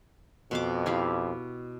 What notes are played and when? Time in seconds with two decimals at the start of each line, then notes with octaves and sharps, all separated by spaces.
0.51 F2 B2 C6 D6
0.86 E4 G4 F5